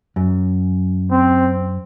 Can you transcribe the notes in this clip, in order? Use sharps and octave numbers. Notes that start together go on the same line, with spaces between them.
F#2
C4